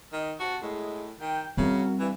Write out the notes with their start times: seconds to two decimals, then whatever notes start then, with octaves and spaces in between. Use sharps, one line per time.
0.12 D#3 D#4
0.39 C3 F#4 A5
0.62 A2 G#3
1.20 D#3 G5
1.57 C#3 G3 C4 E4 F#4 A#4
1.99 G2 E3